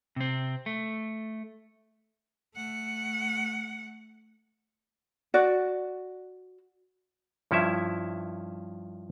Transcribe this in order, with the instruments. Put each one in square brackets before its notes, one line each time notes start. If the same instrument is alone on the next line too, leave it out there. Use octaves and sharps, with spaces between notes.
[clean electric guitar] C3 C4
A3
[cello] A3 F#5
[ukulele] F#4 D5
[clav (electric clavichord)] G2 F3 C#4 E4 E5